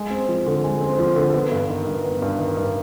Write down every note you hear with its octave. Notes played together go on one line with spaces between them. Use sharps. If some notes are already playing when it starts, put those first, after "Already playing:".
Already playing: G#3
C4
F3
D3
G#3
C4
F3
D3
B3
G2
D#3
G2
B3
G2
D#3
G2